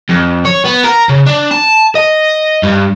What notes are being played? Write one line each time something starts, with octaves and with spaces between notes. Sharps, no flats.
F2
C#5
B3
A#4
C#3
D4
A5
D#5
G2